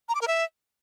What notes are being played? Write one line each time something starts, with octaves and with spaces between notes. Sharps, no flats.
A#5
D6
A#4
E5